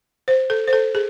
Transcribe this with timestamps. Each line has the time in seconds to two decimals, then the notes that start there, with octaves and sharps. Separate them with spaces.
0.28 C5
0.50 A4
0.68 C5
0.73 A4
0.95 G#4